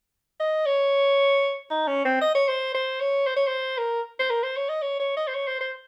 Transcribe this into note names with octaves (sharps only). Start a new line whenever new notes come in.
D#5
C#5
D#4
C#4
C4
D#5
C#5
C5
C5
C#5
C5
C#5
C5
A#4
C5
A#4
C5
C#5
D#5
C#5
C#5
D#5
C5
C#5
C5
C5